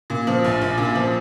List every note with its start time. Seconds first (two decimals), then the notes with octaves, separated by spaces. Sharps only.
0.10 A#2
0.27 F3
0.44 A#1
0.61 A#1
0.78 A#2
0.95 F3